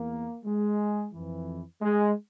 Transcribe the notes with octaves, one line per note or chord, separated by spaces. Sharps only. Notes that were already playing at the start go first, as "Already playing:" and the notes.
Already playing: E2 A#3
G#3
F2 E3
G#3